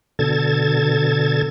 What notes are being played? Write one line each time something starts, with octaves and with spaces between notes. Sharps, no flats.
B2 D3 A4 G#6 A6